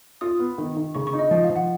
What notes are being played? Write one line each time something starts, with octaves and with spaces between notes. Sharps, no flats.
F4 D#6
B3
D#3
D#3
C#3 C#6
C#6
D#4
D#5
F3 D#5
F5
F3
F#5